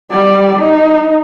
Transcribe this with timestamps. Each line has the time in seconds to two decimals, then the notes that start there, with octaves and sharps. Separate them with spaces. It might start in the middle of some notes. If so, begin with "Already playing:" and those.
0.11 G3 D5
0.59 D#4